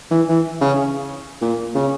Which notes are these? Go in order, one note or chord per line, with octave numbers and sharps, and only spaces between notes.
E3
E3
C#3
A#2
C#3